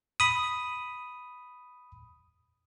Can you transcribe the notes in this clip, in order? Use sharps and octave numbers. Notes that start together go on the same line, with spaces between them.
B5 D#6